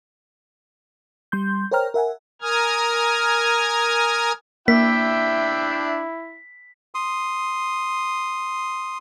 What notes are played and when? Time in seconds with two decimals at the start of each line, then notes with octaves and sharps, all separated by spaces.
1.32 G3 C6 G6
1.71 A#4 C5 C#5 G5 A#5 F6
1.94 A#4 E5 F#5 G#5
2.42 A#4 G#5 D#6 F6 G#6
4.68 A#3 D4 E4 E5 G5 B6
6.95 C6 D#6